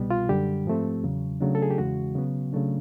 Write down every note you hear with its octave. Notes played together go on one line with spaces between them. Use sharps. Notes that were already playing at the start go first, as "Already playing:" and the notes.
Already playing: C2 B2 G3 B3
F4
F#2 D3 G3 G4
G#2 F3 A3 C4
E2 C#3 F#3
C#3 F#3 A3 D4
A4
G#4
G4
E2 C#3 E3 G#3 F#4
C#3 F#3 B3
C#3 F#3 A3 D4